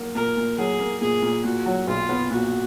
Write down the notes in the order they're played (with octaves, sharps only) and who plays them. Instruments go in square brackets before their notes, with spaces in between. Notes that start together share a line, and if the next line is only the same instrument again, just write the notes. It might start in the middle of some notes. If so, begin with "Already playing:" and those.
Already playing: [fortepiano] F#3 A#3
[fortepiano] A#2 [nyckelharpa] A#4
[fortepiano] A#2
[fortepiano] F#3 [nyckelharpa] G#4
[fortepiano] A#3
[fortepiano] A#2 [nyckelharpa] G#4
[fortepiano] A#2
[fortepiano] A#2 [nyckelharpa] F#4
[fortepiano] F#3
[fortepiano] B1 [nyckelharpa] F4
[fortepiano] B3
[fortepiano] A#2 [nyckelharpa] F#4